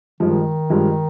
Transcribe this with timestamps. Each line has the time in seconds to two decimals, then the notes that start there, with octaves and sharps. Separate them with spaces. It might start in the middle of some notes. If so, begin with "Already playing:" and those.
0.20 G2 D#3 F3 G#3
0.70 G2 F3 G#3